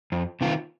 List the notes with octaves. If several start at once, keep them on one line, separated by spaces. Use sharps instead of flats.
F2
C3 D#3 A#3 F4